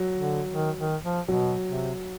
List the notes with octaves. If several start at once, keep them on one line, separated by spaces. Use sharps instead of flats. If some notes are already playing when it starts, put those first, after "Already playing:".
Already playing: F#3
D3
D#3
D#3
F3
B2 F#3
C3